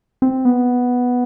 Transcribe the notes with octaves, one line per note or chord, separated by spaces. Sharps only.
C4
B3